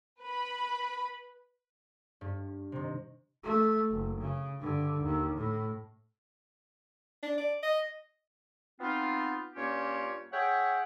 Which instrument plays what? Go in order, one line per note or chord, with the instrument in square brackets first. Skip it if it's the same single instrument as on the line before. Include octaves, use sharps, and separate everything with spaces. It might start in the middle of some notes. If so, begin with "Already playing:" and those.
[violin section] B4 B5
[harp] G2
C3 D#3
[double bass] A3
F#1
C#3
G2 D3
D#2
A2
[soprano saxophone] D4
D5
D#5
[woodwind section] B3 C4 D#4 F4
G2 A#3 C#4 F4 G4 C#5
G#4 C#5 E5 F#5 G5